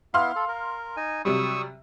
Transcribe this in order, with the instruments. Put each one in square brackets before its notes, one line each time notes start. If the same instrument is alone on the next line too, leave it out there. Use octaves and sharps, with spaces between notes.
[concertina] B3 E4 [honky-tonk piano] F5 C6 F6
[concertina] A4
A#4
D#4 G#5
[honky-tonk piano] C3 F#3 G3 [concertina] C#6 D#6 E6